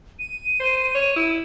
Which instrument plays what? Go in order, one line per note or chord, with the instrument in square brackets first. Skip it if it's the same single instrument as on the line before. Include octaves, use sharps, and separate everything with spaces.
[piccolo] D#7
[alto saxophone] C5
C#5
E4